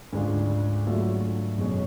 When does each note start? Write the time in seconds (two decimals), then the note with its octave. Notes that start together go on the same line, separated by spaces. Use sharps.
0.13 D2 G#2 C#3 G#3 D4 F4
0.85 D3 F#3 A3 F4
1.58 F#2 B2 G#3 C#4